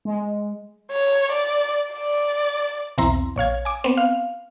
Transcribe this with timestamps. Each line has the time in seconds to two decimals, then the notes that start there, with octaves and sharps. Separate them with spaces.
0.05 G#3
0.91 C#5
1.32 D5
1.93 D5
2.98 B1 E2 C4 E4 A#5 C6
3.36 A#1 C#5 F5 G#6
3.65 G#5 D6
3.84 B3 C4
3.97 F5